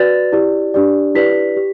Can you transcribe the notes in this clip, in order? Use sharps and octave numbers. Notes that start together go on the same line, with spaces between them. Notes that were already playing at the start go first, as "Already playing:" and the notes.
Already playing: F#4 B4 D5 A6
E4 G4 D5
D4 G4 D5
E4 G4 B4 D5 B6
G4